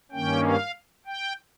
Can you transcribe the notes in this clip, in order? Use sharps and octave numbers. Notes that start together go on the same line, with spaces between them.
G2 D#3 A#3 C#4 G5
F5
G5